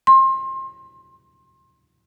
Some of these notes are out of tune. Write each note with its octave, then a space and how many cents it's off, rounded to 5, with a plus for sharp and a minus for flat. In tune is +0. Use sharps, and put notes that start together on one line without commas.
C6 +30